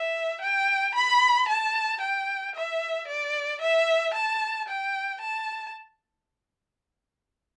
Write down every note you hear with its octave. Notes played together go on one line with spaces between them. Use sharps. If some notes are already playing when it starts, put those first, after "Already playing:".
Already playing: E5
G5
B5
A5
G5
E5
D5
E5
A5
G5
A5